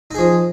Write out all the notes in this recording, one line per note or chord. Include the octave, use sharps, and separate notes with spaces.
F3 D#4 G#4